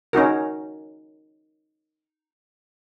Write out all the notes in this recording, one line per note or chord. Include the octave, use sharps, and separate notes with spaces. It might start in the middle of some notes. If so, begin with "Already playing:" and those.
C#4 D#4 F#4 A#4